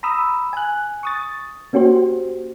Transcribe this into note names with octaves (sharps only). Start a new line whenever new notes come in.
A#5 B5 D#6 E6
G#5 F#6
C#6 D#6 A6
A#3 C#4 F#4 G4 C5